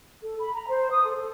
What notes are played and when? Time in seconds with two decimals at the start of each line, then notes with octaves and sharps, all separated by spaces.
0.23 A4
0.40 B5
0.53 A#5
0.68 C5
0.91 D#6
1.03 A4
1.19 A4